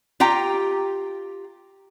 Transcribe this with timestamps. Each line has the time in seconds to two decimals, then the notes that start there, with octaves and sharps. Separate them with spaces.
0.20 F4 G4 G5 A#5